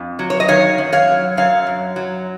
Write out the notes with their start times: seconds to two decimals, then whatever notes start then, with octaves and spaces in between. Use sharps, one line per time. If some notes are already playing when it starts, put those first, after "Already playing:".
Already playing: F2
0.19 F#3
0.30 C#5
0.40 D#5
0.48 D#3 C#5 F5
0.78 F#2
0.93 C#5 F5
1.08 F#3
1.37 F#2 C#5 F5
1.67 F#2
1.96 F#3